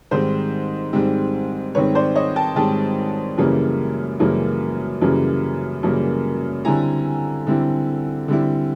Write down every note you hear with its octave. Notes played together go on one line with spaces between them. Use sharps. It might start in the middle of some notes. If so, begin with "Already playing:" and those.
G#2 D#3 G3 C4 C5
G#2 D#3 G3 C4
G#2 D#3 G3 C4 B4 C#5
C5 D5
C#5 D#5
G5 A5
G#2 D#3 G3 C4 G5 A5
F#2 C#3 E3 G3 A#3
F#2 C#3 E3 G3 A#3
F#2 C#3 E3 G3 A#3
F#2 C#3 E3 G3 A#3
D3 G3 C4 E4 G#5 A#5
D3 G3 C4 E4
D3 G3 C4 E4